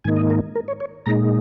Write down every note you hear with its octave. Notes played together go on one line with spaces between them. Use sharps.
G#2 D#3 A#3 D#4 G#5
D#5
A#4
A#4
C#5
C#5
A#2 G#3 D#4 A#5